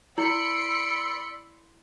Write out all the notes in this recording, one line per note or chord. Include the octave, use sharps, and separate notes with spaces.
E4 D5 B5 C6 E6 C#7